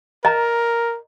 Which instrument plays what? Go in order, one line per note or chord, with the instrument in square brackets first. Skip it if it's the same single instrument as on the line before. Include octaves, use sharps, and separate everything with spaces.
[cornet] A#4 [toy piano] D#5 A#5